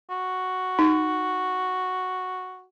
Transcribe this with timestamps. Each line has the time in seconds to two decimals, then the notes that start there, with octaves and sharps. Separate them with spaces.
0.11 F#4
0.79 D#4